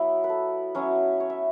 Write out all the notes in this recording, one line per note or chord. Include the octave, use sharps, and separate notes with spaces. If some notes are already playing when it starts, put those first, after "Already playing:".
Already playing: F#3 B3 E4
B4
A4
F#3 B3 C#4 E4 C#5
C#5
E5